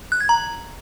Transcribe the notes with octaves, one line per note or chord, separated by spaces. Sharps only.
F#6
G#6
A#5